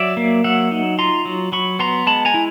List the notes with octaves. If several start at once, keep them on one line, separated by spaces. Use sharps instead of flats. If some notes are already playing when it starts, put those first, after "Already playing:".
Already playing: F#3 D5 E5
A#3
F#3 E5 F#5
D#4
F4 A#5 C6
F#3
F#3 B5 C#6
B3 A#5 C6
G#3 A5 B5
G#5 A#5
E4